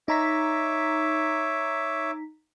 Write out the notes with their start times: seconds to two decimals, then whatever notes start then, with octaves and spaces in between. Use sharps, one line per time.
0.08 D#4 C#5 E5 A#5 D6 B6